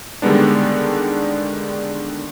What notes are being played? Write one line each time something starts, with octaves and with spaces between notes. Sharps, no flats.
D3 D#3 G3 G#3 B3 D4